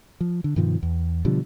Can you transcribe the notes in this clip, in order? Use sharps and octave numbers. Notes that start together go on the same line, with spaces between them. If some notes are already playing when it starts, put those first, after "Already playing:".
F3
D3
G2 B2 D#3 F3
E2
B2 D3 F3 G3